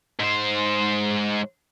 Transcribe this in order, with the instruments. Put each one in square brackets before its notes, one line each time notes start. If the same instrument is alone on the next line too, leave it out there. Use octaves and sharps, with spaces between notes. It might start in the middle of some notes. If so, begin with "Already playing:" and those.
[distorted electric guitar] G#2 C5